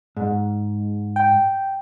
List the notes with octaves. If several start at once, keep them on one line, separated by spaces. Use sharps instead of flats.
G#2
G5